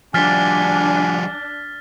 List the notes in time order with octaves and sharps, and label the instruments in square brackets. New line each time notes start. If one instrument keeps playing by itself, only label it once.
[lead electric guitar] F3 G3 [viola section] D4 [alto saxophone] G#5 [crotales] F6 A6 B6